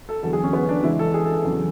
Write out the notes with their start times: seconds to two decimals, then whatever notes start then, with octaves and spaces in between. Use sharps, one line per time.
0.09 A4
0.23 E2 D3 F#3 A4
0.33 G#4
0.44 C#4
0.53 B3
0.69 D4
0.83 E2 C#3 E3 G#3 E4
0.99 A4
1.14 G#4
1.25 A4
1.35 A4
1.45 E2 C#3 F#3